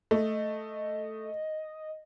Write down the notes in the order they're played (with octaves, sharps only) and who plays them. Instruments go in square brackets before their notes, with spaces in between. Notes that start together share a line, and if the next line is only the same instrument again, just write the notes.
[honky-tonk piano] A3 [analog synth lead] D#5